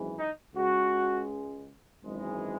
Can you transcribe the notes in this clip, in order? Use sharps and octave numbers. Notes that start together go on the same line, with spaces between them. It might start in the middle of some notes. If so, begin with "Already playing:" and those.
Already playing: G#1 F#2 E3 G#3
D#4
C#2 C#3 G#3 F#4
G#1 F#2 E3 G#3